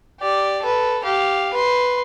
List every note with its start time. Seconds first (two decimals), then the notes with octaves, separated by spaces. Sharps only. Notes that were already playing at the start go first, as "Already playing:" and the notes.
0.20 G4 D5
0.62 A4 B4
1.04 G4 F5
1.53 B4 C6